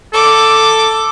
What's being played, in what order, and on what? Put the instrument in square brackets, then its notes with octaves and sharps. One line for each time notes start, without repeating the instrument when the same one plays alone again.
[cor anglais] A4 [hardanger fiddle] D6